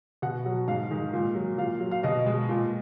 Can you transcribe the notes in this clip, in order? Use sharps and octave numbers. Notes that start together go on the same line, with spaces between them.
B2 F#5
F#3
G#2 F5
D#3 G#3
A#2
F#3
A#2 F5
F#3
F5
B2 D#5
G#3
A#2